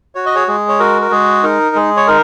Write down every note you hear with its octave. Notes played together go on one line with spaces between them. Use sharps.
F#4 C#5
D#5
G#4 C#5
G#3 G#4
C#5
F#4 A#4
A#4
G#3 G#4
D#4 A#4
G#3 G#4
C#5
D#4 A#4